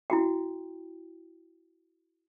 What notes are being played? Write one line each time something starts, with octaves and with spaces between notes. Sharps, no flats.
E4 F#4 G5